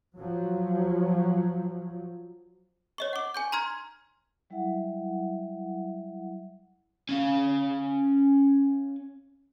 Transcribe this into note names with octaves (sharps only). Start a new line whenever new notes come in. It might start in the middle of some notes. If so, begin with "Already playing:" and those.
F3 F#3
C#5 D#5 C#6
F#5 D6
G#5 C#6 G6
A#5 C6 F6 G#6
F#3 G3 E4 E5 F#5
C#4 F5